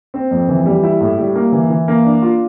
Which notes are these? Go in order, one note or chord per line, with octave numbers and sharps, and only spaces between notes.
C4
F2
E3
G3
E4
A2
G3
A#3
E3
E3
A#3
D4
F4